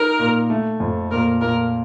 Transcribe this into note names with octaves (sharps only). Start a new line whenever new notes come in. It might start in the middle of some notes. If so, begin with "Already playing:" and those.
Already playing: D#4 A#4
A#2
A3
F2
A#2 A#4
A#2 A#4